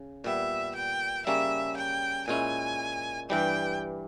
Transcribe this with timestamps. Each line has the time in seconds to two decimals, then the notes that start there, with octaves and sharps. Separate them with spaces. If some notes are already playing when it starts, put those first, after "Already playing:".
Already playing: C#3
0.24 A#2 G3 B3 E5
0.76 G5
1.27 C#3 G3 A#3 C#4 E5
1.77 G5
2.28 A#2 G#3 C#4 E4 G#5
3.30 G2 E3 G3 G5